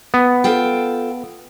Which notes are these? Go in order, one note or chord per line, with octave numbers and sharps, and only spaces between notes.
B3
F4 A4 G5